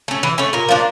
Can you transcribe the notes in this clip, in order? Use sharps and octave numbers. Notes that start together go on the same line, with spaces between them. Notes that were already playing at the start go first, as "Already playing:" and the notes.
A3 C#4
E3
A3 C#4
A#2 A#4
F3 A#3 D4